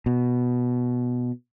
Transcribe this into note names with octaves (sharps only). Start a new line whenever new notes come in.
B2